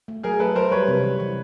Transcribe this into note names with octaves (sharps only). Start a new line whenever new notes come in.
A3
F#3 G#4 A#4
A3 A4 B4
F#3 A#4 C5
G3 B4 C#5
C3
E3
E3